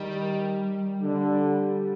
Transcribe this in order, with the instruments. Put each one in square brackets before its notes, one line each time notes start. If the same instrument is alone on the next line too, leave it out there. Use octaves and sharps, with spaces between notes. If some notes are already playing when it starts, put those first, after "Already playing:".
Already playing: [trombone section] D#3 [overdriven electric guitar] G3
[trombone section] D3